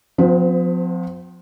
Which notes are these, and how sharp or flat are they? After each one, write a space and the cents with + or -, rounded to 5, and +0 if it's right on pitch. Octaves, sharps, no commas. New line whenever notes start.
F3 +30 C4 -40 C5 -15